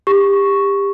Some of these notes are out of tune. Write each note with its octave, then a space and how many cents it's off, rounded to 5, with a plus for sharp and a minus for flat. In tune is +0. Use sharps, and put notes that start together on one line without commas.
G4 +25 C#6 +0